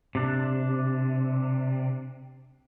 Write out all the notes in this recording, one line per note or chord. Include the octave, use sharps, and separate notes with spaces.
C3 D4